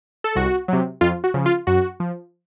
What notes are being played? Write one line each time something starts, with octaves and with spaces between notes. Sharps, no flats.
A4
C2 F#4
C3 F#3
F2 F4
F#4
C#3 F3
F4
F#2 F#4
F3